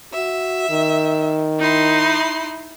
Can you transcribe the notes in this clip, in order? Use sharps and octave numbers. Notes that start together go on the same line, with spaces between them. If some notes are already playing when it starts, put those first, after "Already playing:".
F#4 E5
D#3
D#4 E4 C6